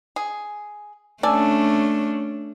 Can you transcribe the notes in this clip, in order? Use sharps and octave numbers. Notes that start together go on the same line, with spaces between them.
G#4
A3 C#4 D4 A4 D5 G#5